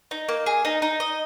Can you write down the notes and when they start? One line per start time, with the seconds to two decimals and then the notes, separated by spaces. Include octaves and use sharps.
0.11 D#4
0.29 A#3
0.46 G#4
0.65 D#4
0.82 D#4
1.00 D#5